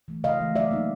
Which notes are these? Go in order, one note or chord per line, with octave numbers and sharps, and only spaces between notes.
E3 A3
C#3 D#5 F5
E3 A3
F#3 D5 E5
A#3 D#4